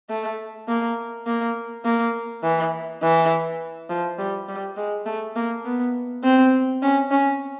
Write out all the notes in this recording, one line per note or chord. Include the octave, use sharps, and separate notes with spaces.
A3
A#3
A#3
A#3
E3
E3
F3
G3
G3
G#3
A3
A#3
B3
C4
C#4
C#4